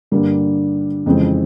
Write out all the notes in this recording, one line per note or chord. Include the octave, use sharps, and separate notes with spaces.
G2 D3 G3 A#3
F2 C#3 E3 G#3 C4